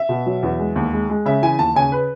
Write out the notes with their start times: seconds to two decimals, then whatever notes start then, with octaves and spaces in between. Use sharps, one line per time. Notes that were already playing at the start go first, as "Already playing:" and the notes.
Already playing: E5
0.09 B2
0.26 F#3
0.43 E2
0.59 G#3
0.76 D#2
0.93 G#3
1.10 G#3
1.25 C#3 E5
1.43 E3 G#5
1.59 D#2 A5
1.75 C#3 G#5
1.92 B4